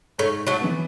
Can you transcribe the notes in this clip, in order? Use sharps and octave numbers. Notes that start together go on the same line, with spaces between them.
G#2 A3 C#4
F#3 A3
E3 B3